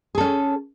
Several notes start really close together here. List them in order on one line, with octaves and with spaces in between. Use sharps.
G#4 A4 C#4